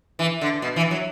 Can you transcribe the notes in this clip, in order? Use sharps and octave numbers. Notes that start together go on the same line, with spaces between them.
E3
D3
B2
E3
F#3